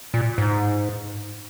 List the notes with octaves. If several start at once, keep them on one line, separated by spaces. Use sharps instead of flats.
A#2
G#2